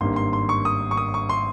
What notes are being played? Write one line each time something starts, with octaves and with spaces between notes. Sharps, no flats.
G#1 G2 G3 A#3 C6
C6
C6
C#6
D#6
C#6
D#6
C#6
C6